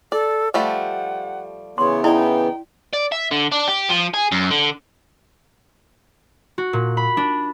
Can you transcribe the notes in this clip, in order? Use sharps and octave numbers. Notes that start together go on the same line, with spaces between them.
A4 D5
F3 G3 A3 F#5
C#3 E3 B3 C#5 C6
D#4 E4 D5 G5
D5
E5
D3
D4
G4
F3
G#4
F#2
D3
F#4
A#2
B5
D4